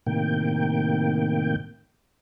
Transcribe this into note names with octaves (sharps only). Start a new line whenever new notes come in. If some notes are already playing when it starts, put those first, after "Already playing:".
A2 C3 D#3 A#3 G5